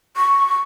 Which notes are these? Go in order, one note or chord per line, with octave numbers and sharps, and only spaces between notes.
C#6